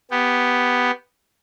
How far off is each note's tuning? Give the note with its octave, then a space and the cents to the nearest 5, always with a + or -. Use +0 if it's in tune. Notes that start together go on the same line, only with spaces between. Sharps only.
B3 +0 G4 +0